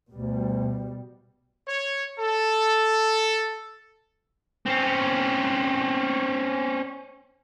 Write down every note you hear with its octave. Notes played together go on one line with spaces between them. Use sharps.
D2 B2 G3
C#5
A4
C4 C#4